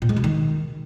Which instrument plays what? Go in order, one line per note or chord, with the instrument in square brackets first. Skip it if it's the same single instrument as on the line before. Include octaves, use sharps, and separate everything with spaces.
[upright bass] A#2
G#3
B2
D#3